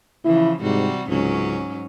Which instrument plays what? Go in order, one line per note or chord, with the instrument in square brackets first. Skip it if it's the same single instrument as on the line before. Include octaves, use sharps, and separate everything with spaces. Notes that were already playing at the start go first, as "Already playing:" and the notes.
[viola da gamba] C#3 E3 F3 [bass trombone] E4
[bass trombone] G#2 [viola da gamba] C3 G3 F#4
[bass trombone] C#2 [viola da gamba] G#2 F#3 C#4